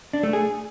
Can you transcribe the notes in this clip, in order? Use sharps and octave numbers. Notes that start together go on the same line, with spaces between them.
D4
A3
G#4